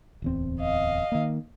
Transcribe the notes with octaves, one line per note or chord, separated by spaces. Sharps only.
D1 E2 C4
D#5 F5
D#3 A#3